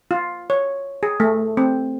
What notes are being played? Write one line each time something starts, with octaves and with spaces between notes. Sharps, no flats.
F4
C#5
G#4
A3
C4